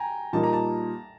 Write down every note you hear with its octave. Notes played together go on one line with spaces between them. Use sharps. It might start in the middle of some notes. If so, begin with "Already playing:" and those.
Already playing: G5 G#5 A#5
A#2 G3 A#3 D#4 A5
A#5
A5